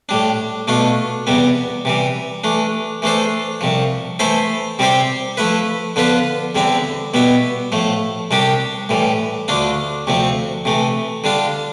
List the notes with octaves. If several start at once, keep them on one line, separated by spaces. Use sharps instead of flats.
A2 G3 D4
B2 A3 D4 F4
E2 C3 G3 B3
C3 E3 G3
E3 A3 D4
E3 A3 D4 A4 C5
C2 C3 F3
E3 A3 E4 A4 C5
C3 G3 C4 G4 C5
F3 A3 E4 B4
D3 F3 B3 F4 B4
E2 D3 G3 C4 E4
B2 G3 B3 E4
A2 F3 A3
C2 C3 G3 D4 G4
A2 E3 G3
D2 D3 A3 D4 F4
D2 C3 F3 C4
C3 E3 A3
D3 G3 D4 F4